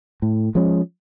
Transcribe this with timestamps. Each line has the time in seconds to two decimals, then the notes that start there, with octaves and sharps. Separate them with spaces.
0.22 A2
0.55 F3 G#3 C#4